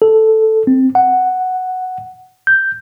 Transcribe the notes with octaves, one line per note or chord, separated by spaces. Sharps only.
A4
C4
F#5
G6